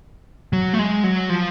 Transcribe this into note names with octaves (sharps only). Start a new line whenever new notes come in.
F#3
A3
G#3
F#3
F3